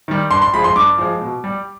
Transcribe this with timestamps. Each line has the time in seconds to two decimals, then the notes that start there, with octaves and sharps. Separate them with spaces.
0.08 D#3 G3
0.31 G2 C6
0.42 C6
0.54 F3 G#3 B5
0.64 C6
0.76 G2 D6
0.98 F3 G#3
1.21 B2
1.44 G3